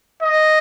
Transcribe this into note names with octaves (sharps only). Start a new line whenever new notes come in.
D#5